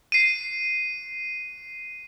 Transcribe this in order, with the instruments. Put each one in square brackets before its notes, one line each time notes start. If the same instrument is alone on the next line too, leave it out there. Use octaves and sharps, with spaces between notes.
[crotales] C7 D#7